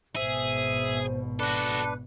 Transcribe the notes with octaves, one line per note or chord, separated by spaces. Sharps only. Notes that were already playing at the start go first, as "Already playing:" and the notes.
G#1 B2 G#4 C5 E5
D4 F#4 A4 B4 A5